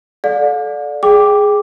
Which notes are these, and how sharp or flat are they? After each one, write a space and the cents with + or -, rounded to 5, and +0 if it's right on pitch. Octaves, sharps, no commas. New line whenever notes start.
A4 -25 D5 +0 F5 +40
G#4 +0 G5 +0 D6 +0